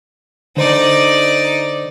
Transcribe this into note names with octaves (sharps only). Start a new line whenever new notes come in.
D3 D#4 C5 D5